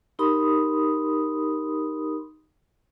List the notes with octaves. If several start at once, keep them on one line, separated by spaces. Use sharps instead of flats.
D#4 G4 A#4 B5 C6 D#6